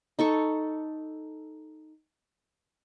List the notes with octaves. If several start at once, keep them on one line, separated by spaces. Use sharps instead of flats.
D#4 A4 C#6